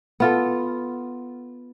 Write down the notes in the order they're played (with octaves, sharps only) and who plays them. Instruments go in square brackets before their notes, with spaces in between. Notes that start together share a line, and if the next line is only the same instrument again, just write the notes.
[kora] B3 F4 A4